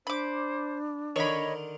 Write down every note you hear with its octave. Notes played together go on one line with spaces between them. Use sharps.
D4 C5 B5 D6
D3 D#3 C#5 D#5 B5